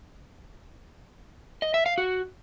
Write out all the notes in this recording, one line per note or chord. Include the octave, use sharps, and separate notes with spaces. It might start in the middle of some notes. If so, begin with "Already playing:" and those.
D#5
E5
F5
F#4